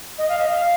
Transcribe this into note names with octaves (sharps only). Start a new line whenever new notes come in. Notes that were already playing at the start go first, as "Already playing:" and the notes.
D#5
F5
D#5
F5